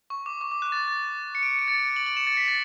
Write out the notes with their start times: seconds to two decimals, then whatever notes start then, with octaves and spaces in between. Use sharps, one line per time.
0.10 C#6
0.26 D6
0.41 C#6
0.52 D6
0.62 F#6
0.72 A6
0.88 A6
1.35 C#7
1.43 D7
1.51 C#7
1.59 D7
1.67 A6 C#7
1.96 D7 F#7
2.06 D7 F#7
2.17 C#7 E7
2.27 A6 C#7
2.37 B6
2.48 A6 C#7